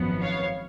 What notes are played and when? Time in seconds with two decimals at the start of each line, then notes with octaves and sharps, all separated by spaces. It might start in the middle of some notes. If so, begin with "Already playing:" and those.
Already playing: G#1 F#2 F3 B3
0.22 C#5 F5